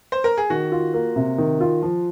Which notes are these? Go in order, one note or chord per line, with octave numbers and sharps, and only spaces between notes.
C5
A#4
G#4
D#3 F#4
F4
A#3
C3
D#3
F4
F3